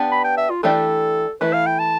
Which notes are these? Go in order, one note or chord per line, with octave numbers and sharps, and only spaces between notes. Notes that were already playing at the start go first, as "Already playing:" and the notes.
Already playing: B3 D4 G4
B5
G5
E5
F4
E3 A3 D4 G4 A4 D5
E3 A3 E4 B4
F5
G5
A5